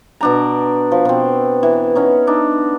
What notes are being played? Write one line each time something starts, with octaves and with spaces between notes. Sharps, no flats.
B2 D4 A#5
F3
B2 C4
E3
B3 C#4 D#4
D4 D#4